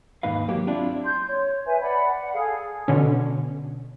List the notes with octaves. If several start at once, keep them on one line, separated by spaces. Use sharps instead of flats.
D#2 G#2 D#4 B4 F5
F#3 A#3 G4
C4 D4 E4 F4 G4
C6 G6
C#5
B4 E5 G#5
D5 F#5 B5
F#5
G#4 A4 F5
B2 D3 C#4